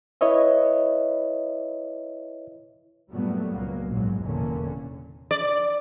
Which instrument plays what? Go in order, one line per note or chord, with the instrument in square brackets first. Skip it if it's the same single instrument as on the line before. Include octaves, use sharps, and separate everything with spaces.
[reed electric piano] E4 B4 C#5 D#5 E5
[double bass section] G2 A#2 F#3 G3 A3 B3
C#2 F#3 A#3 B3
A#1 G#2 F#3
F1 E2 A#2 D3 A#3 C#4
[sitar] D5